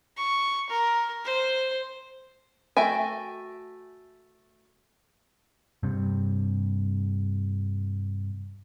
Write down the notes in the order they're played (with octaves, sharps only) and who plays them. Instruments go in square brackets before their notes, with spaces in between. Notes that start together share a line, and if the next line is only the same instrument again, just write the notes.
[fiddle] C#6
A#4
C5
[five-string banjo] A3 F#4 E5 G5 G#5
[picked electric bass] G2 C3